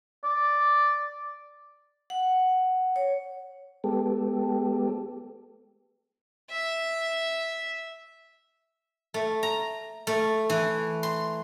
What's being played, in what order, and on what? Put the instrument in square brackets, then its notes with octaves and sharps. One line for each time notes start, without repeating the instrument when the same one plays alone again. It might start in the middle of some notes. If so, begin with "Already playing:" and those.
[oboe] D5
[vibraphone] F#5
C#5
[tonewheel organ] G#3 B3 G4 A4
[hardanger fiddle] E5
[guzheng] A3
A#5
A3
E3
C6